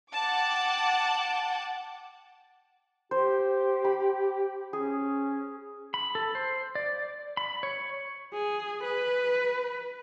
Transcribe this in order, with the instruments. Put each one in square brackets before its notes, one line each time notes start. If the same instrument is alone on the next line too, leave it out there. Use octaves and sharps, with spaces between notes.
[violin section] F#5 G5 A5 D6
[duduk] G4 [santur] C5
[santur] B5
[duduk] C#4 [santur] G#4
[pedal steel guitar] B5
A4
C5
D5
B5
C#5
[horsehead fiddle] G#4
B4